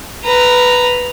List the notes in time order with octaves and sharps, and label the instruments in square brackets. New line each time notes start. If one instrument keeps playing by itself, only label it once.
[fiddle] B4 A#5